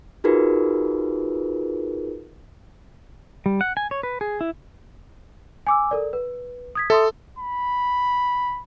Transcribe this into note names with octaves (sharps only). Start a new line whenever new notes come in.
D#4 F4 F#4 G#4 A#4 B4
G3
F#5
G#5
C#5
B4
G#4
E4
G#5 D6 E6
A4 A#4 D5
B4
D#6 G#6 B6
A4 E5 C6 D#6
B5